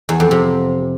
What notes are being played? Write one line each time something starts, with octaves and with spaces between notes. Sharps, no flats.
E2
F2
C3